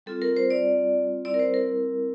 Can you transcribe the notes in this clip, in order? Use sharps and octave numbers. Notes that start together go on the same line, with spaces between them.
G3 C4 F4 A4
A#4
C5
D5
G3 C4 E4 D5
A#4
C5
A#4